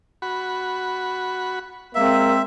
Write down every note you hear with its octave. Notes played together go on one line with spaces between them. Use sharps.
F#4 B5
G#3 A#3 C4 E5